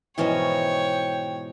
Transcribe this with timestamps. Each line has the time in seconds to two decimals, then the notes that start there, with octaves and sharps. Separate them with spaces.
0.18 G#2 B2 E3 F3 C#4 C#5 D#5 G5